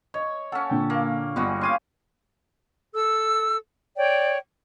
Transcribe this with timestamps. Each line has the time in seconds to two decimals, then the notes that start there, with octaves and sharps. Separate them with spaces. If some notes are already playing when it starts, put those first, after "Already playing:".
0.14 C#5 D#5
0.52 C#4 A4 F#5
0.69 A#2 D3 G5
0.90 A#3
1.36 G1 G3 G#3 F#4
1.61 C#4 G4 F5 C6 G#6 D#7
2.94 A4 E6
3.95 C#5 D5 G5